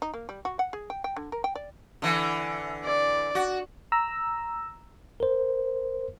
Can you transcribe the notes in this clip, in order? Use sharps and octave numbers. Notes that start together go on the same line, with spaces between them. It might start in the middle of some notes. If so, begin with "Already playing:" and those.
D#4
A#3
G3
F#4
F#5
G#4
G5
G5
D3
A#4
G5
D5
D3 E3
D5
F#4
A#5 E6
A#4 C5